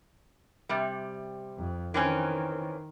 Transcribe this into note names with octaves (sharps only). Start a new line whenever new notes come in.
C3 G3
F2
D#3 E3 C4 C#4